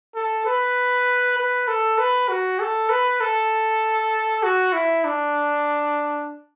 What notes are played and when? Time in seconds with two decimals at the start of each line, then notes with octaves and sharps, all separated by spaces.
0.15 A4
0.46 B4
1.38 B4
1.68 A4
1.98 B4
2.29 F#4
2.60 A4
2.90 B4
3.21 A4
4.43 F#4
4.73 E4
5.05 D4